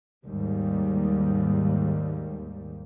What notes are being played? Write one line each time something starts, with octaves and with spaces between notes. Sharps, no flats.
D#2 G#2 G3